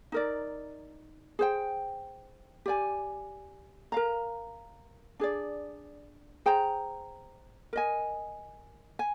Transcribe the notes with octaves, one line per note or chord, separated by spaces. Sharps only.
D#4 A#4 D5
G#4 C5 G5
G4 D5 G#5
A#4 F5 A#5
D4 G#4 D5
G#4 C5 G5 A#5
A#4 D#5 G#5
G#5